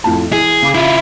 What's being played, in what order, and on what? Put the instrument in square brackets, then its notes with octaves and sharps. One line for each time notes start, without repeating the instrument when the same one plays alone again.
[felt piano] F2 A2 A5
[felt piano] E3 [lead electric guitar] G#4
[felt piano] C#3 D6
[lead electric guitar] E4 F4